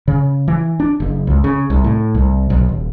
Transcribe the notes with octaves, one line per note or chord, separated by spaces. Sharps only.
C#3
E3
D4
F#1
C#2
C#3
C2
A2
C2
B1
D#1